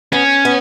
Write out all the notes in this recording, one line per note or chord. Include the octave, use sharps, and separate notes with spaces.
B3 C#4
B3